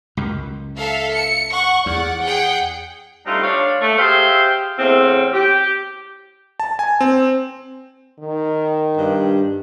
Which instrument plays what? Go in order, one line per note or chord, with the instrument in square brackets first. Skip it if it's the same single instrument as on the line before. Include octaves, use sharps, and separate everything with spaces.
[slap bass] C#2 F#2
[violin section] A4 E5 F5
C#7
F#5 C#6
[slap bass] E2 [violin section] D5 F#5
[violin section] G#4 F#5 G5
[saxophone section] G3 A3 C4 D4 D#4 F4
D4 C#5 F5
A3
G4 G#4 C5 E5 F5
E2 A2 C#3 C4
G4
[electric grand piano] A5
G#5
C4
[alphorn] D#3
[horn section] G2